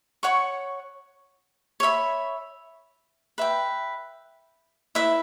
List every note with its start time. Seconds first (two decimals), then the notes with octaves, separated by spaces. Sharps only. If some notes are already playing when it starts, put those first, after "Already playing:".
0.23 C#5 F#5 C#6
1.80 C#5 E5 B5
3.38 B4 E5 G5
4.95 E4 B4 E5